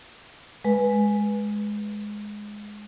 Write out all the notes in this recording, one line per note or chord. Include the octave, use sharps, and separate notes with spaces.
G#3 B4